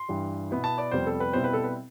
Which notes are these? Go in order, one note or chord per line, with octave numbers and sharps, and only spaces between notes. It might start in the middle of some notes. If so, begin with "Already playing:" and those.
Already playing: C6
G2 E3 G3
B2 B3 E4
A5
D5
F2 C3 G3 B3 C5
A4
B4
B2 G3 C4 E4 C5
B4
A4
B4